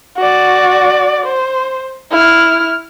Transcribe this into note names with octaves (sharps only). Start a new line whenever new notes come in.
F#4 D5
C5
E4 F6